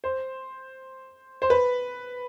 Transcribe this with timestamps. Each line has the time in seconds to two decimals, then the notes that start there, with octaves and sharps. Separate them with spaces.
0.04 C5
1.42 C5
1.50 B4